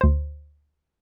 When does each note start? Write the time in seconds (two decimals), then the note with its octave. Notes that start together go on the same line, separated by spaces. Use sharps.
0.01 D2 C5